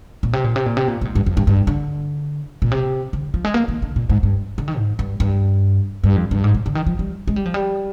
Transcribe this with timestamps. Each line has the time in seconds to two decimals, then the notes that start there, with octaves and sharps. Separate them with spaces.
0.23 A#2
0.33 C3
0.44 A#2
0.56 C3
0.66 A#2
0.77 C3
0.88 A#2
1.01 A#2
1.05 G#2
1.15 G2
1.26 F2
1.37 G2
1.47 G2
1.67 D3
2.62 A#2
2.71 C3
3.13 D3
3.34 F3
3.45 G#3
3.54 A#3
3.68 D#3
3.82 D3
3.96 A#2
4.10 G#2
4.23 G2
4.58 D3
4.68 D#3
4.78 G#2
4.99 G2
5.20 G2
6.04 G2
6.16 F2
6.31 G2
6.44 G#2
6.54 A#2
6.66 D3
6.75 D#3
6.86 F3
6.99 G3
7.28 G#3
7.36 G3
7.45 F3
7.54 G3